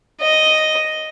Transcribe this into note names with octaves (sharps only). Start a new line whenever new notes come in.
D#5